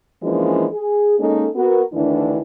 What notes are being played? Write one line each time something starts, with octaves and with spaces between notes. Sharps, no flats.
E3 F3 G#3 A#3 C#4 D4
G#4
G#3 A#3 C#4 D#4 A4
B3 F#4 A#4
D2 D#3 E3 D4 E4